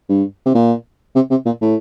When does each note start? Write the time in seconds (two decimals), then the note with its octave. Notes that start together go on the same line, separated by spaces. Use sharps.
0.09 G2
0.46 C3
0.55 A#2
1.16 C3
1.31 C3
1.46 A#2
1.62 A2